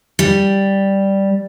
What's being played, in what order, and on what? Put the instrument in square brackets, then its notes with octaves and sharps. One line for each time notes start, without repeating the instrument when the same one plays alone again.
[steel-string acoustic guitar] G3